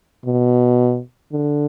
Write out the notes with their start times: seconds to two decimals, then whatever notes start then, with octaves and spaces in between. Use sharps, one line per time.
0.25 B2
1.32 D3